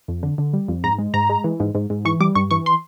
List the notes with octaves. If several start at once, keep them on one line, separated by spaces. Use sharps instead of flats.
F2
D3
D3
G3
F2
G#2 A#5
G#3
G#2 A#5
G#3
E3
G#2
G#2
G#2
E3 C#6
G3 D6
G2 C#6
E3 C#6
C6